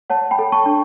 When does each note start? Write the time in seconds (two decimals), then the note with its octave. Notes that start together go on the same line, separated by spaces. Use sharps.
0.10 C#5 F#5 A5
0.31 G5 B5
0.39 A4
0.52 A5 C#6
0.66 D4